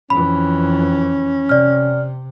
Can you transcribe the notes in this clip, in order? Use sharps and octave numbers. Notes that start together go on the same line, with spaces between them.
F2 E3 C#4 B5
C3 D5 F6